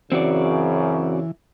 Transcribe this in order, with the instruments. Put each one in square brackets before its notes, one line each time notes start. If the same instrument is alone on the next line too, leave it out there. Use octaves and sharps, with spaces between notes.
[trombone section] F#2 C#3 [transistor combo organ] E3 [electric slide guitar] C4 F#4 D5